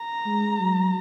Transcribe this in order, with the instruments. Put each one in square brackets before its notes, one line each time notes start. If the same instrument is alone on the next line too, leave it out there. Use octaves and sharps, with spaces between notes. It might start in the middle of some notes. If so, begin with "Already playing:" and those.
Already playing: [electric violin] A#5
[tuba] G#3
F#3